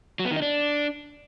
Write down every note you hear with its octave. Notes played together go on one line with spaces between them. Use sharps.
F#3
B3
D#3
D#4
D4